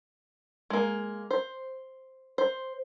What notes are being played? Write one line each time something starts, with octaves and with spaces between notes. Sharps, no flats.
G#3 A#3
C5
C5